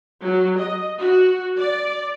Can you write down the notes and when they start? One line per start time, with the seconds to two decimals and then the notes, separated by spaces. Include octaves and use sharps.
0.21 F#3
0.59 D#5
0.99 F#4
1.58 D5